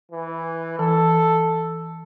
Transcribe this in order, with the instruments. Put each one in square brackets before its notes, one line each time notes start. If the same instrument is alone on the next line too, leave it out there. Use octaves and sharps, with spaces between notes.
[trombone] E3
[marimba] E3 [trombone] A4